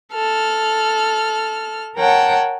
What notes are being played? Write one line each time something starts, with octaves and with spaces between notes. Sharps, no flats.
A4 F6
A#4 C#5 F#5 G5 A5